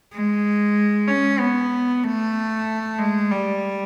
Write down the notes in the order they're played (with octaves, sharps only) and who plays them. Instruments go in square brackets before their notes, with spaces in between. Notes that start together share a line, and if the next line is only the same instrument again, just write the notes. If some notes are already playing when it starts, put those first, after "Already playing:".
[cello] G#3
C#4
B3
A3
G#3
G3